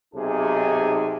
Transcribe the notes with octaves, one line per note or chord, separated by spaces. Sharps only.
B1 C3 D#4 G#4 A4